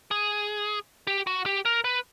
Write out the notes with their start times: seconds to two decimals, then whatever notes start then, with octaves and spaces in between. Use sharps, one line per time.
0.11 G#4
1.07 G4
1.27 F#4
1.46 G4
1.65 A#4
1.84 B4